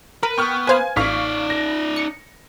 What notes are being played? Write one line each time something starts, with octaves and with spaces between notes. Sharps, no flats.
A#4 B4
B3 G5 C#6 F6
B4 C5 F5 G#5 G#6
A1 D#4 D5 F5 C#6 B6
A#6
C#7